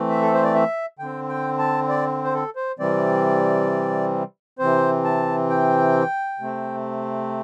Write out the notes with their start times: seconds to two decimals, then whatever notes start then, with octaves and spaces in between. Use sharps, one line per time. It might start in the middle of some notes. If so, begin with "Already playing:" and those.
Already playing: E3 A3 C4
0.10 E5
0.22 A4
0.33 C5
0.44 D5
0.54 E5
0.99 D3 C4 G5
1.29 G5
1.59 A5
1.89 D5
2.24 C5
2.34 A4
2.56 C5
2.79 C3 E3 G3 C4 D5
4.59 C3 E3 C4 C5
5.04 A5
5.50 G5
6.39 C3 A3 C4